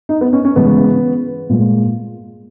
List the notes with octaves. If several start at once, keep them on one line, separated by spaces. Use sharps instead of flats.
D#4
B3
C#4
C#4
C#3 E3 G#3 B3
A#2 G#3